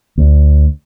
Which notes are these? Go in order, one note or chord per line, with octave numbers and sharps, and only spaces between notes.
D2